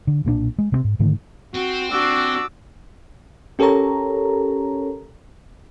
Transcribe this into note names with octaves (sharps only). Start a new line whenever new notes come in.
D3
B1 A#2 G3 D4
G#3
C3 A3 C4
G#2
G#2 D3 D#3 A3
C4 F#4
D4 F#4 D6 E6
C#4 G4 A4 A#4 C#5 A#5